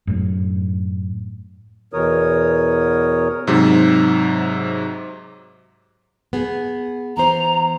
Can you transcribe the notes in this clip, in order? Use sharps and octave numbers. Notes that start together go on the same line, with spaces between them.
F#2 A2
E2 B2 E3 A#4 C#5 D#6
G#2 C3 F#3
B3 G#4
E3 B3 C5 A#5